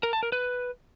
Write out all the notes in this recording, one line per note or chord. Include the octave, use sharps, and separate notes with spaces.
A#4
A5
A#4
B4